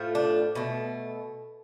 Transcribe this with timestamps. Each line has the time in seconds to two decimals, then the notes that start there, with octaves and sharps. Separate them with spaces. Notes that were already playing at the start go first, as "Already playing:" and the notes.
Already playing: A2 F3 A3
0.15 D4
0.55 B2 A3